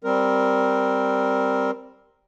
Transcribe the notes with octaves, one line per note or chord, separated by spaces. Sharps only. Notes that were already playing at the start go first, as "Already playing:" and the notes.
G3 C4 A#4